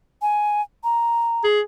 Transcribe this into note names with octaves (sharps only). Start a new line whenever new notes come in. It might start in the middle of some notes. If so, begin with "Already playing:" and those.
G#5
A#5
G#4